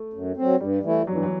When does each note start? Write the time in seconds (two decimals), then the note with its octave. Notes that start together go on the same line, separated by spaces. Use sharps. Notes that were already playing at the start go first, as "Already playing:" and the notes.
Already playing: A3
0.13 F#2
0.37 F#3 C4
0.60 G2 G3
0.83 E3 A3 E4
1.07 G2 F#3
1.15 E3
1.23 F#3